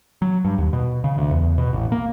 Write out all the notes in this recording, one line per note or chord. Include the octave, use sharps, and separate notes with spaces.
F#3
G2
D#2
B2
C#3
D2
E2
B2
A1
A#3